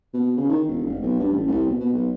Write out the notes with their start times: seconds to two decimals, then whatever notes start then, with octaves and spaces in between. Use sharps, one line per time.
0.14 B2
0.37 C#3
0.49 D#3
0.67 E1
0.85 F1
1.02 B1
1.19 G2
1.33 A1
1.48 C2
1.67 B2
1.80 B2
1.94 B1